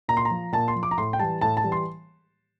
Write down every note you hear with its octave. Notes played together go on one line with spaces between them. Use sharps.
A#2 A#5
C6
A#5
F3
A#2 A5
C6
F3
D6
A#5
A2 C6
G5
E3 G3 A5
A2 A5
A5
E3 G3
C6